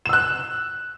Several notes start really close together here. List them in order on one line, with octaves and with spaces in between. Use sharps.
E7 E6 F#6